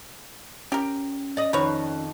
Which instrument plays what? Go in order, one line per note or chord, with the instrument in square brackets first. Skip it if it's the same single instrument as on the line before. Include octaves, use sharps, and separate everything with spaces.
[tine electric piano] C#4 [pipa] G4 A#4
[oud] D5 D#5
[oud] F2 D#3 [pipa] B4 C#5